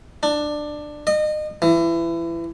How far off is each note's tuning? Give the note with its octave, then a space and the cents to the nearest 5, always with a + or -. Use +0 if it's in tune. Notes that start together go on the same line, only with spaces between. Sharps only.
D4 +15
D#5 -30
E3 +25